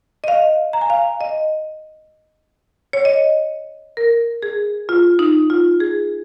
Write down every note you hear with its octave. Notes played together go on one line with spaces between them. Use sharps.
D#5
F5
A#5
G#5
F5
D#5
C#5
D#5
A#4
G#4
F4
D#4
F4
G#4